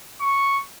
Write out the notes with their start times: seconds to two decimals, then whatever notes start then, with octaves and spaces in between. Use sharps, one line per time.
0.21 C#6